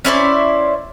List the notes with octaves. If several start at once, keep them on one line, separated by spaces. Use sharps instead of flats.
C#4 E4 C5 D5